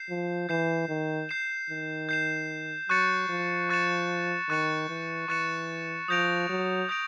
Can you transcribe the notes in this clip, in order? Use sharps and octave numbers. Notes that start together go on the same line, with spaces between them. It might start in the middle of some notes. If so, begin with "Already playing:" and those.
Already playing: G6 C7 E7
F3
E3 G6 C7 E7
D#3
G6 C7 E7
D#3
G6 C7 E7
F#3 C#6 F#6 A6 C#7 E7
F3
C#6 F#6 A6 C#7 E7
D#3 C#6 F#6 A6 C#7 E7
E3
E3 C#6 F#6 A6 C#7 E7
F3 D#6 G6 A#6 D7 F7
F#3
D#6 G6 A#6 D7 F7